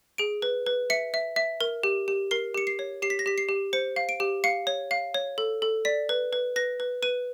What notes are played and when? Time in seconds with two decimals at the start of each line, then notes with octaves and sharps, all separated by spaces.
0.18 G#4 D7
0.42 B4
0.66 B4
0.90 E5 C#7
1.14 E5
1.36 E5
1.61 A#4
1.83 G4
2.08 G4
2.31 A#4 C7
2.54 G4 C#7
2.67 C7
2.79 C#5
3.02 G4 C7
3.10 B6
3.19 A#6
3.26 G4 B6
3.38 C7
3.49 G4
3.73 C5 C#7
3.96 F5
4.09 D7
4.20 G4
4.44 F5 C#7
4.67 C#5
4.91 F5
5.14 C#5
5.38 A4
5.62 A4
5.85 D5 B6
6.09 B4
6.33 B4
6.56 B4 A#6
6.80 B4
7.03 B4 D#7